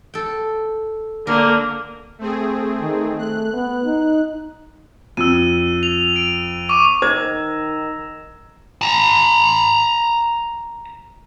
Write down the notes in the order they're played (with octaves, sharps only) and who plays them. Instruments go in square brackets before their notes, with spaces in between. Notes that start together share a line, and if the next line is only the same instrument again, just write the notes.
[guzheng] A4 G5
[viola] D3 A#3 [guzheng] A#4
[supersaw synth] A3 C4 G#4
[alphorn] D#3
[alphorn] A3 [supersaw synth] F#6
[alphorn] B3
D#4
[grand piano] F2 [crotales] E6 D#7
[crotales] F7
D7
C#6 D6 D#7
[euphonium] D#3 [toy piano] C5 [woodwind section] D#5 A#5 E6 [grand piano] G#6
[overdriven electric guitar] A5 A#5